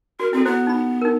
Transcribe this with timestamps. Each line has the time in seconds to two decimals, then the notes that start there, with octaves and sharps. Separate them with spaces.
0.20 F#4 A#4
0.33 C4 E4 F#4 A4
0.45 B3 E4 F#4 C5
0.67 D#4 B5
1.02 D#4 A#4